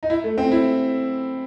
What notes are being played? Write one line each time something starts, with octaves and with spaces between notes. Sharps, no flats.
D#4
E4
A3
C4
E4